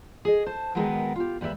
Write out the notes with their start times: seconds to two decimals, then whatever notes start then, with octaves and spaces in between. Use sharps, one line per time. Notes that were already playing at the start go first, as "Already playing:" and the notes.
0.25 G#4 D#5
0.46 C5 A5
0.75 D#3 F#3 G#3 B3 A#4 G5
1.16 F4 G4
1.41 D#2 G3 B4 D5 E5